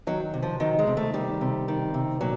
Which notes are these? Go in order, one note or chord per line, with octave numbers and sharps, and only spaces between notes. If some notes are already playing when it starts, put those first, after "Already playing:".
D#3 F#3
C3
F3
D#3 F#3
G#3
C3
A3
D#3 G3
C3
D#3
C3
A#2 F#3